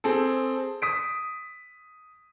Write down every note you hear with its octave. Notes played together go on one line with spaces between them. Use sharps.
C4 G#4 A4
D#6 B6 D7